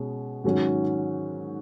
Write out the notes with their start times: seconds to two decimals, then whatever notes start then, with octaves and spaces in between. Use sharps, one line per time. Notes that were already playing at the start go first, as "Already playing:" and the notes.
Already playing: B2 G#3 C#4
0.44 G#2 D#3 F#3 C#4 F#4